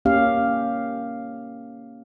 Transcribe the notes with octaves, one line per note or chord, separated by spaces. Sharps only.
A#3 C#4 G4 F5